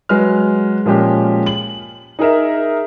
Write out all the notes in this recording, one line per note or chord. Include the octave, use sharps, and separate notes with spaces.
F#3 G#3 B4 F6
A#2 F3 G#3 C#4 G4
F#7
D#4 G#4 A#4 E5